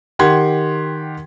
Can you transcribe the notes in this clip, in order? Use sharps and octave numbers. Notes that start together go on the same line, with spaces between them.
D#3 G4 F#5 C6 G#6